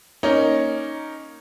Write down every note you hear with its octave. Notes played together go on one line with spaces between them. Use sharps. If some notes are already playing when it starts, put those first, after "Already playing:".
A#3 C#4 D#4